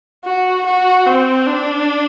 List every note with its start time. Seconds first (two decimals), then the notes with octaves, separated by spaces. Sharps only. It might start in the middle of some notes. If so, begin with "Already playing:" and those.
0.25 F#4
0.66 F#4
1.07 C4
1.48 D4